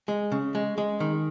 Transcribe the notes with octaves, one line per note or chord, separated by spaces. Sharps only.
G#3
C#3
G#3
G#3
D#3